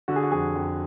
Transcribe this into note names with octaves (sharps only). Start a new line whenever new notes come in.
D3 F#4
G#4
F#4
F2 G#4
F2